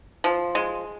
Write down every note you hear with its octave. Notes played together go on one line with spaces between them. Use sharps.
F3
G#3